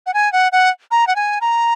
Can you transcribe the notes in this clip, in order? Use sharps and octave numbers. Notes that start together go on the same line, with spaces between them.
F#5
G#5
F#5
F#5
A#5
F#5
G#5
A#5